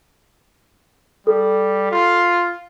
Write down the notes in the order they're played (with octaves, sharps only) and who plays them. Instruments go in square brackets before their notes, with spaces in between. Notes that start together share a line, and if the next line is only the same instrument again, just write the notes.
[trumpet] G3 [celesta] A4
[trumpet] F4